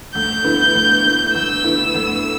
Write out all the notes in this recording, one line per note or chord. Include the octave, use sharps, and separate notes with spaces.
D2 G6
D3 B3 E4
D2
D3 B3 E4
D2 E6
D3 B3 E4
D2